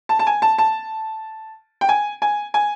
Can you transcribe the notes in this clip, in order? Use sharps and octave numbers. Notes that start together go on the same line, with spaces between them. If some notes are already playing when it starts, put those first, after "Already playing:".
A5
A5
G#5
A5
A5
G5
G#5
G#5
G#5